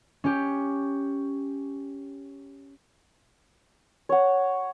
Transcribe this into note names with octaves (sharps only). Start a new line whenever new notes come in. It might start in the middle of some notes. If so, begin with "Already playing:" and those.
C#4 G4
C#5 F#5